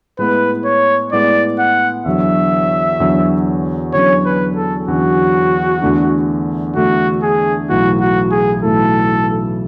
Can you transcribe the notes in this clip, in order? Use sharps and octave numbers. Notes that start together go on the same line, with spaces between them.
A2 G#3 B3 E4 B4
C#5
A2 G#3 B3 E4 D5
F#5
E2 D3 F#3 E5
E2 D3 F#3
E2 D3 F#3 C#4 C#5
B4
A4
E2 D3 F#3 C#4 F#4
E2 D3 A3 D4
E2 D3 A3 D4 F#4
G#4
B1 A2 E3 A3 E4 F#4
F#4
G#4
B1 A2 E3 A3 E4 A4